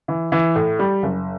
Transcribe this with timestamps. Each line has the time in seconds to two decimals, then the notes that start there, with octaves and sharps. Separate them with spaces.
0.08 E3
0.32 E3
0.55 A2
0.79 G3
1.03 F#1